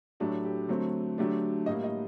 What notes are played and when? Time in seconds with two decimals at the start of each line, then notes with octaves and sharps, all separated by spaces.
0.20 A2 F#3 A3 D4 G4
0.45 G4
0.68 D3 F#3 A3 C4
1.18 D3 F#3 A3 D4 G4
1.66 A2 G3 A#3 D#5
1.84 D#5